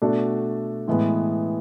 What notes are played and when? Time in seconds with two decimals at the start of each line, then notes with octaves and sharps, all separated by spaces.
0.02 B2 A3 D4 F#4 A4
0.88 A2 E3 G#3 B3